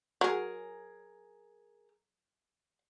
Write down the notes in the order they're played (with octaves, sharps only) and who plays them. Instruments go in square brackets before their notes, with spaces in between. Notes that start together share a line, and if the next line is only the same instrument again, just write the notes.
[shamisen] F#3 [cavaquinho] G#4 A#4